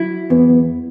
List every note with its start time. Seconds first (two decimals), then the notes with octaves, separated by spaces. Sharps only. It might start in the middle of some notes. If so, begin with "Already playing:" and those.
Already playing: F#3 E4
0.30 E2 B3